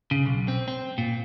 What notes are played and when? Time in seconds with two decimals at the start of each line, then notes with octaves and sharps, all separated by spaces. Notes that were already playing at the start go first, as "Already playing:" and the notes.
0.11 C#3
0.26 B1
0.48 C4
0.68 C4
0.98 A#2